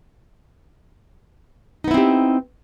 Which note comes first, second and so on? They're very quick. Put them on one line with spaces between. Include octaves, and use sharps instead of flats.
D#4 B3 E4 C4 G4